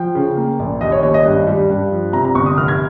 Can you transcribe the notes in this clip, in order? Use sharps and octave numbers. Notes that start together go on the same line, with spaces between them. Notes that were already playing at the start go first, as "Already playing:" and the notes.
Already playing: F3 G5
C#3
A#3
A#1
D#2 D#5
C#5
D#2 C#5
D#5
G2
G3
G2
F3
C3 A#5
A#5
G1 C#6
D#6
F1 F6
G#6